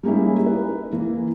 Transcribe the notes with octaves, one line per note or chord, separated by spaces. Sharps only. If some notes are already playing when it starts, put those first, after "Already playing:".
G3 G#3 A#3 C#4 D#4 E4
B4
E3 A#3